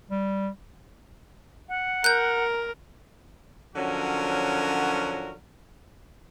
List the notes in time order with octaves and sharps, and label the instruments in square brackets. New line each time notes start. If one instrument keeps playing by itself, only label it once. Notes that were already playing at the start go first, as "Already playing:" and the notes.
[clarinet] G3
[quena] F#5
[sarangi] A#4 [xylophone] F#6 G6
[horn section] D3 F3 F#3 C#4 F#4 A#4